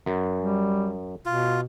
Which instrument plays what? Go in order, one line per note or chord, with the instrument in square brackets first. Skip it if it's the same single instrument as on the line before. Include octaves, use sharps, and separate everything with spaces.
[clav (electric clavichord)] F#2
[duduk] G3
[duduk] B2 [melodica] F4